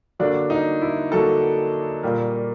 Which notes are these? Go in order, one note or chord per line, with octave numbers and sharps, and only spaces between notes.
D3 F#3 A#3 D4
D#4
E4
D3 F#3 A#3 A4
A#2 G3 A#3